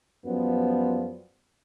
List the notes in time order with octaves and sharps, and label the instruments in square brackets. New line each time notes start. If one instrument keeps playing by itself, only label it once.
[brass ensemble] F#2 F3 G3 B3